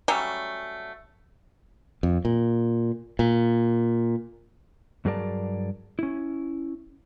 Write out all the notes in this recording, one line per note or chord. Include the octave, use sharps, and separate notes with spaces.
F#3 G3 A3 C#4
F2
A#2
A#2
G2 F#3 G#4 A#4 D5 A5
C#4 E4